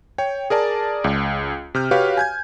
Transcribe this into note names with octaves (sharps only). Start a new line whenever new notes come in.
C#5 G5
G#4 A#4 D5 A5
C#2
C3 F6 G6
F#4 G4 B4 C#5 F5
G#5 G6 G#6